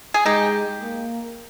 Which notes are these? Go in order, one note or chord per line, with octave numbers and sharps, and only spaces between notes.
G#4
G#3 D#4 G4
A#3